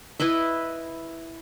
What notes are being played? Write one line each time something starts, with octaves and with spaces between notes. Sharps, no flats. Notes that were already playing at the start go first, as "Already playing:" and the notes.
E4 B4 D#5 E5